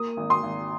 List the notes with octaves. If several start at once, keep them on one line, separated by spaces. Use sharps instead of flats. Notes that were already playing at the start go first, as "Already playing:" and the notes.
Already playing: A#3 D#6
G#1
C6 D#6
G#1